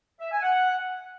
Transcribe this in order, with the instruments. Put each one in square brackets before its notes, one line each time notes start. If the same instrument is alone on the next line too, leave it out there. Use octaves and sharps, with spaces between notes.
[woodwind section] E5
G#5
F#5